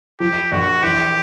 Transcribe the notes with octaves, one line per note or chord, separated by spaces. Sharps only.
F3 G4
A#1 F#4
E3 G4